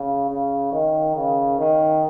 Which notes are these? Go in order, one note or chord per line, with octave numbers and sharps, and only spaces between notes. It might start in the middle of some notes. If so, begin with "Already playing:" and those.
Already playing: C#3
C#3
D#3
C#3
D#3